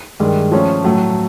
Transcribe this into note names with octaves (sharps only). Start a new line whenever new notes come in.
G2 D#3 G#3
F3 A3 C#4 F4
A2 F#3 A3